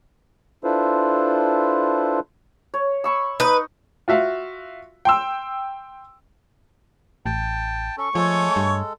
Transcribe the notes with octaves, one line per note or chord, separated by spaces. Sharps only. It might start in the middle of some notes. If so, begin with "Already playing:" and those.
D4 E4 F4 A4 B4 C5
C#5
B5 C#6 E6
D#4 B4 D#5
F4 F#4 E5 F5
G5 C6 E6
A1 G5 A5
C#4 A4 C#6
F3 G#3 A3 A4 C#5 G#5
G2